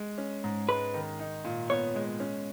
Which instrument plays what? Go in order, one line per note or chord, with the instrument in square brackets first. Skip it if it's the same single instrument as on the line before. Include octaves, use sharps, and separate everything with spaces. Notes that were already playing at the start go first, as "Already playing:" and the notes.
Already playing: [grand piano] G#3
C#4
G#2
[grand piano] G#3 [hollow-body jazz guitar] B4
[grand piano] D#3
D#4
A#2
[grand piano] B3 [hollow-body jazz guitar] C#5
[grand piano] G#3
C#4